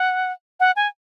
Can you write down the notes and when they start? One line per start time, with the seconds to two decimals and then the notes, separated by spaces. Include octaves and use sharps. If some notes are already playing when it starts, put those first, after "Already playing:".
Already playing: F#5
0.60 F#5
0.76 G#5